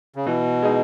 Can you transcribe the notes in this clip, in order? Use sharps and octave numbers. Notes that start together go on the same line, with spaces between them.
C#3
B2 E3
G#3 D#4 G#4